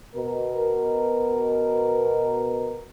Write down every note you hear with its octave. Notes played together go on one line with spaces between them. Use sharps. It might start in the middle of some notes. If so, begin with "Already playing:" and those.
B2 A#4